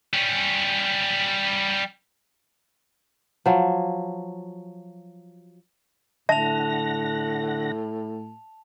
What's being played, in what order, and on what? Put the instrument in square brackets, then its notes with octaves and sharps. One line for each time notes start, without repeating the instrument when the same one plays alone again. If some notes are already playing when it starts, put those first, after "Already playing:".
[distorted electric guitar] G3 C#4
[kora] F3 F#3
[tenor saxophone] A2 [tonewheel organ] D3 F#5 A#6 [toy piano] E5 [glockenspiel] A5 F7